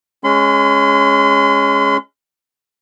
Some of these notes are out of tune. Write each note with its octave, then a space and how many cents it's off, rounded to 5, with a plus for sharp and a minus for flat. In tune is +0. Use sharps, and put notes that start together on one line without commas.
G#3 +0 C#4 +0 C6 -40